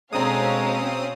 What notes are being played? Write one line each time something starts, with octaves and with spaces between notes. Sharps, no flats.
D2 B2 G#3 C4 C#4 F5 A#5 D#6